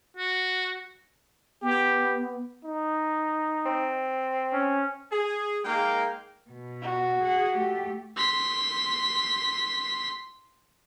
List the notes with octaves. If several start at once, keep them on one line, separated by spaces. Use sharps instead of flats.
F#4
B3 G4
D#4
C4
C#4
G#4
G#3 A#3 D#4 F5 G5
B2
F#4
G#4 F#5
A3 G4
C6 B6